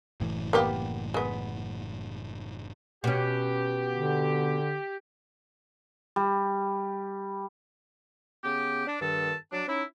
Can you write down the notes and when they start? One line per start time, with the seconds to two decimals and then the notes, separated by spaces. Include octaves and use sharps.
0.20 F#1 A2 E3
0.53 A#3 B3 G4
1.14 G#3 B3
3.04 B2 C#4 G4
3.95 D3
6.16 G3
8.44 C#3 B3 G4
8.87 D4
9.01 G2 D#3 A4 A5
9.52 F#3 D4
9.68 C#4 D#4 E4